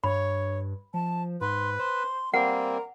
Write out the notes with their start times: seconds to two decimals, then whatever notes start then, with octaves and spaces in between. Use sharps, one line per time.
0.04 G2 C#5 B5
0.94 F3 A5
1.41 G#2 B4 C6
1.79 C5 C6
2.34 G3 A#3 C4 A#4 F#5 A#5